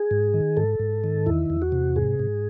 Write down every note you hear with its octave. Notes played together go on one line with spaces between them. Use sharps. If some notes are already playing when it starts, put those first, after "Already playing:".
Already playing: G#4
G#2
D#3
G#2 A4
G#2
D#3
E2 E4
E2
F#4
C3
G#2 G#4
G#2